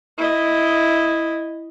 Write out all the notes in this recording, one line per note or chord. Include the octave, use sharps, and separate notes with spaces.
E4 D#5